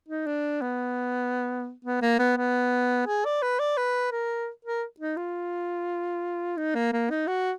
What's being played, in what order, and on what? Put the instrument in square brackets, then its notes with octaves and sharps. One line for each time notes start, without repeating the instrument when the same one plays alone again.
[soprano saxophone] D#4
D4
B3
B3
A#3
B3
B3
G#4
D5
B4
D5
B4
A#4
A#4
D#4
F4
D#4
A#3
A#3
D#4
F#4